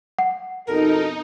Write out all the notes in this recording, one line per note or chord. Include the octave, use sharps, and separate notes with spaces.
F#5
F2 B2 D#4 A4 A#4